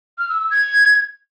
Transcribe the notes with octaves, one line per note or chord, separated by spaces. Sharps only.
F6
E6
E6
G#6